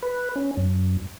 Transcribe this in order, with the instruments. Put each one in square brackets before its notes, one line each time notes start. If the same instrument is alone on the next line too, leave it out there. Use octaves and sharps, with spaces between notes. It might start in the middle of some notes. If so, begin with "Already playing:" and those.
[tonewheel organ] B4
C#4
F#2